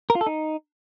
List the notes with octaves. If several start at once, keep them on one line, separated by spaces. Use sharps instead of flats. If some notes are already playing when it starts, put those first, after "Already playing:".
A#4
F4
A4
D#4